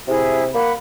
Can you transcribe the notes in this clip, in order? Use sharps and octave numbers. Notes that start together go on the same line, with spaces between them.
C3 E4 G#4
A#3 F#5 B5